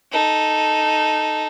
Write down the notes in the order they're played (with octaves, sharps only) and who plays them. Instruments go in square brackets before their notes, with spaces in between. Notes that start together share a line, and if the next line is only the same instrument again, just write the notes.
[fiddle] D#4 A4